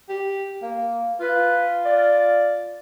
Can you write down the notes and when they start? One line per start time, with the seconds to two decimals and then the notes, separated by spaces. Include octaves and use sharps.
0.09 G4
0.62 A#3
1.20 F4 B4
1.85 D5